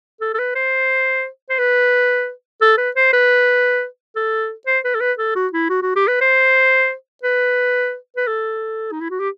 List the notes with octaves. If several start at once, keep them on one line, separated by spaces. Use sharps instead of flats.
A4
A4
B4
C5
C5
B4
A4
B4
C5
B4
A4
C5
B4
A4
B4
A4
F#4
E4
F#4
F#4
G4
B4
C5
B4
B4
A4
D#4
E4
F#4
G4